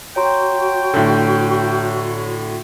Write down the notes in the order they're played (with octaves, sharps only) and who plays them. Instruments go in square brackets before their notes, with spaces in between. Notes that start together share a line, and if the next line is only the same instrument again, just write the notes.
[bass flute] F#4 [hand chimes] C#5 A#5 C6 [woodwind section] G5
[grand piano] A2 D3